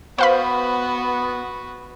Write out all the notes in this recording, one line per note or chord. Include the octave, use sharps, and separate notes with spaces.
B3 F#4 B4 C5 F5 B5